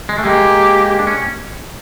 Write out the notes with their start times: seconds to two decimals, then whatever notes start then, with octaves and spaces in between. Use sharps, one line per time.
0.09 G#3
0.18 A3
0.25 G#3 A#3 G4
0.99 D4
1.07 C#4